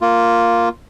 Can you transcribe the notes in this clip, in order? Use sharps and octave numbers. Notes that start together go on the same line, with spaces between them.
A#3 F4